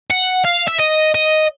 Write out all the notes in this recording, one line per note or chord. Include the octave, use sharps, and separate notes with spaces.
F#5
F5
E5
D#5
D#5